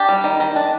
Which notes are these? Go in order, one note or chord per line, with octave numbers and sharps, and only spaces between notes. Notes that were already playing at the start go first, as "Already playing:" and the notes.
Already playing: D4 G4
G3
D#3
D#3
D4